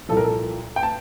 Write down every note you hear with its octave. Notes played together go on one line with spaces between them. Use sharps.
C2 A#2 F3 A4
A#4
A4
G5
A5